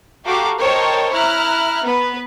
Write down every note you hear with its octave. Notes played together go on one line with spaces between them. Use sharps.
F#4 G4 A4 F5 A#5 D6
A#4 C5 C#5 D#5 G5 A5
E4 A#5 F6 F#6
B3 B4